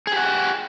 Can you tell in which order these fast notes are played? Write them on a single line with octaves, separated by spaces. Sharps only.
G#4 G4 F#5